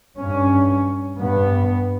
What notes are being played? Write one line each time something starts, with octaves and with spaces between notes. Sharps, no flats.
G2 C#4
G2 B3